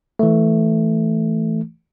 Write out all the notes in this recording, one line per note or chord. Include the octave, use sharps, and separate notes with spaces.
E3 A3